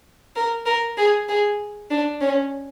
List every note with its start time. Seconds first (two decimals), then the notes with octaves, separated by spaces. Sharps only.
0.36 A#4
0.66 A#4
0.97 G#4
1.29 G#4
1.90 D4
2.21 C#4